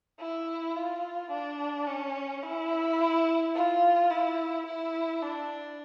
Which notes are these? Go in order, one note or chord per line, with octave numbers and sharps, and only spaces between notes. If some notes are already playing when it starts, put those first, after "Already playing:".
E4
F4
D4
C#4
E4
F4
E4
E4
D4